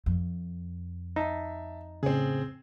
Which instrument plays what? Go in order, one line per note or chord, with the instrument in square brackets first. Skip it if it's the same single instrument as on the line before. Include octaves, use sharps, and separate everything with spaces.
[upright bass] F2
[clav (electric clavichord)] D#4 [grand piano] E5 A5
[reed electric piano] A2 C#3 [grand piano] C4 G#4